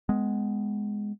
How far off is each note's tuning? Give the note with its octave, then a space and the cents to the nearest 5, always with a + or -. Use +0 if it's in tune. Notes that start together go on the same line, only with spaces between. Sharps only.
G#3 +0 B3 +20